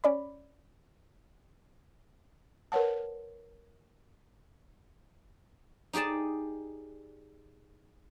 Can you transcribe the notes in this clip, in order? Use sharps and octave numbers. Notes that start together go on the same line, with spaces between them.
C#4 D5 B5
A#4 B4 C#5 F#5 A5
D#4 G4 G#4 D5 A5